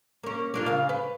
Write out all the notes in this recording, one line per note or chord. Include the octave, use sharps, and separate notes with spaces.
A#3 C#4
A#3 D4 F4
C#3 F5
B4